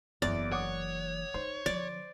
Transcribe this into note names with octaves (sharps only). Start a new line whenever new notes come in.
F#1 E2 E3 D5
C#5 F#5 D6 D#6
D#4 C5
D3 F3 D5